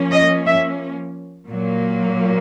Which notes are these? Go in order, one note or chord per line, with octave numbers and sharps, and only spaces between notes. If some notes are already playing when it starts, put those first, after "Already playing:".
Already playing: F3 A#3 C#4
D#5
E5
A#2 F#3 A#3